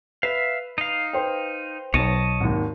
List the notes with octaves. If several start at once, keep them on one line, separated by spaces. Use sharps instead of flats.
B4 E5 F5
D#4 F5
B4 C5 G5
B1 C#5 D#5 A5
G#1 D#2